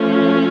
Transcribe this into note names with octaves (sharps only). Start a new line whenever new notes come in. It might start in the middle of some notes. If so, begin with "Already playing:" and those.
Already playing: F3 A3 C#4